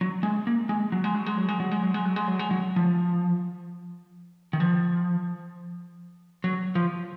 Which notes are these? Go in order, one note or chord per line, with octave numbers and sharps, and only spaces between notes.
F#3
G#3
A#3
G#3
F#3
G#3
F#3
G#3
F#3
G#3
F#3
G#3
F#3
G#3
F#3
G#3
F#3
G#3
F#3
F3
D#3
F3
F#3
F3